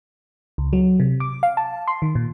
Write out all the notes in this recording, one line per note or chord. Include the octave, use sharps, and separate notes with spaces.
C#2
F#3
C3
D6
F5
A5
C6
D#3
A#2